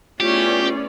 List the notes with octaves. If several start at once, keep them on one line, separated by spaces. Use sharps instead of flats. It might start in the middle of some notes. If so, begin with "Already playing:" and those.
A3 B3 C#4 E4 F4 G4 G#4 D5